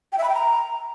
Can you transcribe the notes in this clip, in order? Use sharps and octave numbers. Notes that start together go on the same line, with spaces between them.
G5
E5
B5
G5
A#5